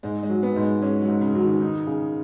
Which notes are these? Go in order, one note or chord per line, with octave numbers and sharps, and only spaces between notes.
G#2 G#3
G#3
F#3
B3
G#2
G#3
G#3 C#4
F#3
G#2
C#3
F#3
D#3
D#4
C#3